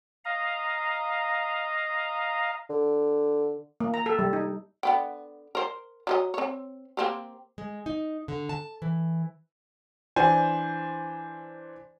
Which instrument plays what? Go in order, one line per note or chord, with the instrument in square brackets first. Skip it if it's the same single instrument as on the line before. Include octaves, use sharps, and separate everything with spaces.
[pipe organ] D#5 F5 A#5
[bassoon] D3
[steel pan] A#3
A#5
A4
G3
D#4
[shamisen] D3 B3 G5
A#4 C5
F#3 G4 D#5
C4 C#5
A#3 C4 G4
[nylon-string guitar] G#3
D#4
D3
A5
E3
[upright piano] E3 D4 C5 G#5